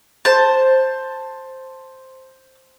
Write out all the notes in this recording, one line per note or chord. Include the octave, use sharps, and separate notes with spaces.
C5 A5